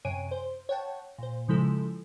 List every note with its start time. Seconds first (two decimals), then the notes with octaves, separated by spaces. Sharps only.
0.05 F#2 C3 C#5 G#5 D7 D#7
0.31 C5
0.69 C#5 F#5 G5 A5
1.18 A#2 C5
1.48 C#3 F3 G#3 E4 A4